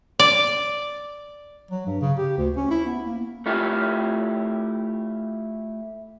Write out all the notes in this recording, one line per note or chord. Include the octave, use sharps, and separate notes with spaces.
D5
F#3
G2
C#3
G4
D2
C#4
E4
B3
A#3
A3 E4 F4 G4